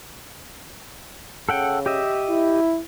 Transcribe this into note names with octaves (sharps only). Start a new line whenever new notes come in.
C#3 A4 F#5 G5
G4 D#5 E5
E4